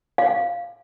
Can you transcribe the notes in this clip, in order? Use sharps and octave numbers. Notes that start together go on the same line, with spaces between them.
F5